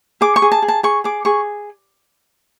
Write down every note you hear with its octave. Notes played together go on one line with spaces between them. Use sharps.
G#4 D6
C#6
G#4
A5
G#4
A5
G#4 C#6
G#4 D6
G#4 C#6